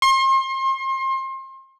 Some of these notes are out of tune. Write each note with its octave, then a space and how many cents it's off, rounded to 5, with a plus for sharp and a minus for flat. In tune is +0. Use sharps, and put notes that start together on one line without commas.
C6 +35